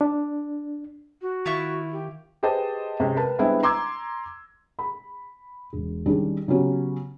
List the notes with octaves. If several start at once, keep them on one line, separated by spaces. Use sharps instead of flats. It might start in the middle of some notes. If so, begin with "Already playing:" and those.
D4
F#4
D#3 E4 F4 E5 C#6
G4
G4 G#4 B4 C5 D#5 A5
C3 G#3 C#4
A#4 B4 A5
G3 G#3 B3 C4 D4 E4
A#5 C6 D6 E6 G#6
B5
E1
D#3 G3 C#4 D4 G#4
C#3 F#3 B3 C#4 G4